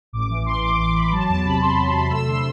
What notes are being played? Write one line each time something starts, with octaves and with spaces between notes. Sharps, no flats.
A1 D6
E3 D6
E3 C6
A1 D6
A1 D6
A1 B5
F#3 A5
E2 A5
C3 B5
C3 C6
F#3
C3
A3 E6
D3 C6